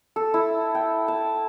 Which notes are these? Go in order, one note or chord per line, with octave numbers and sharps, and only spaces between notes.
A4
E4
G5
A5